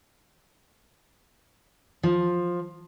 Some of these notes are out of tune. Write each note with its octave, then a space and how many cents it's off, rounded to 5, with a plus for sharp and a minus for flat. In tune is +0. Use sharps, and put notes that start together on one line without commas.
F3 +10